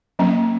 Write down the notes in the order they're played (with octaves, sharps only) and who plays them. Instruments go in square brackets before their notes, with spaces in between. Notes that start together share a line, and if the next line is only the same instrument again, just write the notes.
[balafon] F#3 A#3 C#4